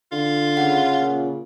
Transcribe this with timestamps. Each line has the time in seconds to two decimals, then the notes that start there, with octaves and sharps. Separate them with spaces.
0.12 D3 F4
0.57 C#3 F#5
1.00 A#2